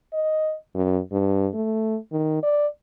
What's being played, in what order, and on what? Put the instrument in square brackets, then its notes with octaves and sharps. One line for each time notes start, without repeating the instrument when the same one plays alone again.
[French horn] D#5
F#2
G2
A3
D#3
D5